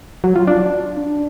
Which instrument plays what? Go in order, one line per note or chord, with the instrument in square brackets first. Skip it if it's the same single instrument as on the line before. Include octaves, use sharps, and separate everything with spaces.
[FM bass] F#3
F4
D4